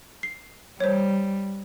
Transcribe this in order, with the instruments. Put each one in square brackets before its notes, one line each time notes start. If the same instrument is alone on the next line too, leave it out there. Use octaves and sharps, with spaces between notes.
[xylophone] C7
[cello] G3 [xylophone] C5 C#5